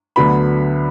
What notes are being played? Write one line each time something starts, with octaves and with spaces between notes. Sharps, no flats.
D2 D3 F#3 B3 B5